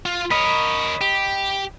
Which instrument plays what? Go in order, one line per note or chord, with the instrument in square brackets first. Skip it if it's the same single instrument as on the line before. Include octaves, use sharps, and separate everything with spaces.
[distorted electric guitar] F4
[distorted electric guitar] A#4 C#5 [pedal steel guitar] D#5 B5
[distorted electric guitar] G4